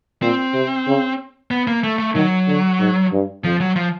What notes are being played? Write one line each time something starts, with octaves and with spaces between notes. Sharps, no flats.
A#2 C4
C3
C#3
B3
A#3
A3
A3
D#3 F#3
D3
G#2
G2
F2 F3
F#3
F3